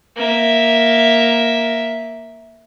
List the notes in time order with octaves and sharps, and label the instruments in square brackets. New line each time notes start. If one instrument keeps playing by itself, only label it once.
[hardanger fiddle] A#3 E5